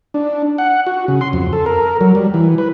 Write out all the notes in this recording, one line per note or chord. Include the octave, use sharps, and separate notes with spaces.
D4
F#5
F#4
C#3
C6
F2
A4
A#4
F#3
G3
E3
B4